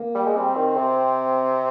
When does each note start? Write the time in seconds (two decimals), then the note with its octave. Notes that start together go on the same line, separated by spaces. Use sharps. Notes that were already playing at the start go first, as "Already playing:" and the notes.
Already playing: A#3
0.15 G3
0.26 G#3
0.35 G3 C4
0.56 D#3
0.76 C3